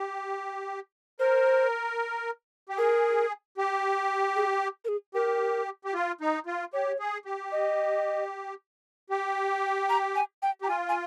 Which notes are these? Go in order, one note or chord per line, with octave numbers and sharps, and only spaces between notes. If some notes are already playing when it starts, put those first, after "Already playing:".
Already playing: G4
A#4 C5
G4
G#4 A#4
G4
G#4
A#4
G#4
G4 A#4
G4
F4
D#4
F4
G4 C#5
G#4
G4
D#5
G4
A#5
G#5
G5
G4 A#5
F4 G#5
G#5